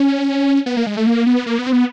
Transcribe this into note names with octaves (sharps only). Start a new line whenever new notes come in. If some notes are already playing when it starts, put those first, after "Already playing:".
Already playing: C#4
B3
A#3
G#3
A3
A#3
B3
A#3
B3
C4
B3